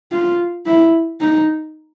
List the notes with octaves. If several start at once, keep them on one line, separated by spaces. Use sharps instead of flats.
F4
E4
D#4